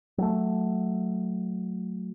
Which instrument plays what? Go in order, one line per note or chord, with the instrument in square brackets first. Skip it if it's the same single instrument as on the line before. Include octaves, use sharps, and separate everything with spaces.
[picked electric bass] F#3 A3